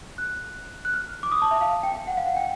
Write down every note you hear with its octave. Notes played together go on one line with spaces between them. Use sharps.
F#6
F#6
F6
D6
D#6
A5
E5
F5
G5
G5
F#5
F5
F#5
G5